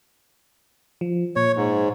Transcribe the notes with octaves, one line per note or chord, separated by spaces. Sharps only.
F3
A#2 C#5
G#2